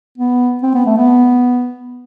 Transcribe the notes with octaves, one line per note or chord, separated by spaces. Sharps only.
B3
C4
B3
A3
B3